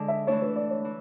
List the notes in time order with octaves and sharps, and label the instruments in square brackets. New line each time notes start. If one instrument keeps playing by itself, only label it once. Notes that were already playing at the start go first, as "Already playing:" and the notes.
Already playing: [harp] D3 G#3 D4
[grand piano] E5
[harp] E3 A3 D4 [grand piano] C#5
[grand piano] B4
D5
C#5
[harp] E3